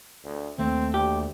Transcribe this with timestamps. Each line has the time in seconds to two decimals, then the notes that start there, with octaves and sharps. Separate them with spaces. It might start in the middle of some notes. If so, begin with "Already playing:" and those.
0.25 D2
0.58 D#2 A3 C4
0.94 D2 G4